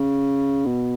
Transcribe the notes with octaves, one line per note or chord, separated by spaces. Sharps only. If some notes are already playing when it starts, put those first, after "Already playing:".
Already playing: C#3
B2